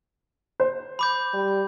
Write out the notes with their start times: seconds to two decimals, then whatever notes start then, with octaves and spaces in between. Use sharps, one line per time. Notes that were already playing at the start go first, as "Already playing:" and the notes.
0.60 C5
0.99 B5 D6 G6
1.34 G3